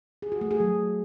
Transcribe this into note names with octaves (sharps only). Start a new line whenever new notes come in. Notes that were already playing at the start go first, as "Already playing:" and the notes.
G#4
F#4
A3
G#4
F#3